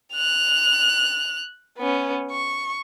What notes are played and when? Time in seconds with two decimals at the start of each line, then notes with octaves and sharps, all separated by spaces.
0.14 F#6 F7
1.78 B3 C#4
2.31 C#6